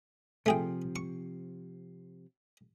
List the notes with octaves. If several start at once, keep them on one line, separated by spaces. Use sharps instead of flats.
C3 F3 A3 G#4 G5
C#6